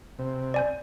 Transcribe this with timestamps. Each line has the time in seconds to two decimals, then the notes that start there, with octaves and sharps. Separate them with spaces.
0.19 C3
0.54 D5 G#5 G6